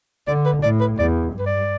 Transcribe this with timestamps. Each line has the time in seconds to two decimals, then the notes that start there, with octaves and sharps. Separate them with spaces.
0.27 D3 D5
0.46 B4
0.63 A2 D5
0.81 B4
0.99 E2 D5
1.34 G2
1.39 B4
1.46 D5